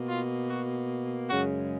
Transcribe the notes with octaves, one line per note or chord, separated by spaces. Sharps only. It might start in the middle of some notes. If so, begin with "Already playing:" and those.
Already playing: B2 A#3
F4
F#4
F#2 C#3 G#3 F#4